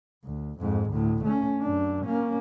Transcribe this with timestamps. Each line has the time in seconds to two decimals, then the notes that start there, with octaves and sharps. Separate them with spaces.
0.24 D2
0.60 F2 G#2
0.90 D2 A2
1.24 A3 C#4
1.61 F#2 D4
2.05 A#3 C#4